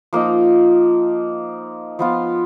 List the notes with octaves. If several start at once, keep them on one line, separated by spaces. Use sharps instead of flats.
F3 A#3 D#4
F3 B3 F4